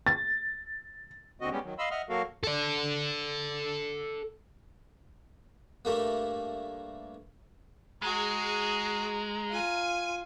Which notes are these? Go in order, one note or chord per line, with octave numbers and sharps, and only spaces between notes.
A6
D#2 D3 C4 F#4 D#5
G3 G#3 B3 C#4 G4
D#3 F#3
D#5 F5 B5 C6 E6
D#5 E5 F#5 F6
F#3 A#3 F#4 A4 A#4 F5
A4 D5
G2 A3 A#3
G#3 F#4 G#4 A#5
F4 G#5 D#7